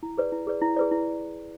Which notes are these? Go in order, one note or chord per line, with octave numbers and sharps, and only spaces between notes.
E4
G#4 B4 D5
E4
G#4 B4 D5
E4
G#4 B4 D5
E4